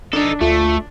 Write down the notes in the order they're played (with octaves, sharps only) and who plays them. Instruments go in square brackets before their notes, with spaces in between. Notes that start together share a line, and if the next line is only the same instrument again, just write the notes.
[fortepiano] D4 [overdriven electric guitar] D#4 A4
[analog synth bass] D2 [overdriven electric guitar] A3 [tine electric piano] F4